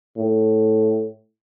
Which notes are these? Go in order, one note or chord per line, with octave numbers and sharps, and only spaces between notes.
A2